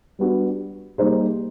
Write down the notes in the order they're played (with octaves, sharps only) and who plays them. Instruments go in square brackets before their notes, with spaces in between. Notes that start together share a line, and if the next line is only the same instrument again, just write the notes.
[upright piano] G3 B3 D4 F#4
G3 A#3 D#4 G#4 C5